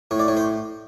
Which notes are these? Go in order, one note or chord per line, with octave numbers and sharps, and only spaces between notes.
A2 C#5
D5
A2 C#5
C5